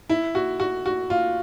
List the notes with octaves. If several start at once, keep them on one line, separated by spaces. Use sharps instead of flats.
E4
F#4
F#4
F#4
F4